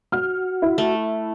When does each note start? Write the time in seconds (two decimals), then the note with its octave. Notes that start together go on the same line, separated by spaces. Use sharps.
0.12 F#4 F6
0.62 E4
0.78 A3